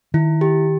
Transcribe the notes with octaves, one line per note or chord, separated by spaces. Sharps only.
D#3 E4
G4